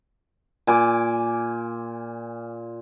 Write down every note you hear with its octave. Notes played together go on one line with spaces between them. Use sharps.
A#2 G#5 D6